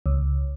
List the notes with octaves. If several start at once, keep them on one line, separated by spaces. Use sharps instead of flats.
C#2